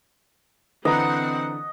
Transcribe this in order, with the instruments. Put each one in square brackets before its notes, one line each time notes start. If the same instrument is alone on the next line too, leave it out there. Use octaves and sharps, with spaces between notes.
[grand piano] D3 E3 [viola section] C4 F#5 [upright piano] B4 A#5 [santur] D#5